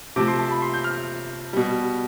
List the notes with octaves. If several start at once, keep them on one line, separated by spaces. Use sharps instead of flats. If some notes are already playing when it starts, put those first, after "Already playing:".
C3 F3 A3 D6
C6
A5
B5
C6
G6
F6
B2 G3